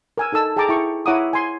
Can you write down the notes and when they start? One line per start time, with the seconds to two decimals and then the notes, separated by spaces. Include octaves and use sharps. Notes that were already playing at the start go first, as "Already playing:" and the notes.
0.18 A#4 G#5 E6
0.32 D#4 A4 A5 E6
0.56 G#4 G5 A5 A#5 D6
0.69 E4 G5 C#6
1.06 E4 C#5 F#5 A#5 D6 D#6
1.33 G#5 C6